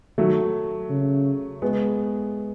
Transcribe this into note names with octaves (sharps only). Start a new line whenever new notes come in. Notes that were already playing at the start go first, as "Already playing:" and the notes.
D#3 F#3 A3
C#3
G#3 B3